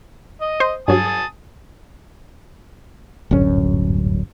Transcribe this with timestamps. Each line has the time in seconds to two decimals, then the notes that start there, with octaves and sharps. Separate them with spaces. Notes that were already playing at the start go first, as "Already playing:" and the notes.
0.42 D#5
0.60 C5
0.88 G2 F#3 G#5 A5 D#6
3.31 D1 G1 F#2 C#4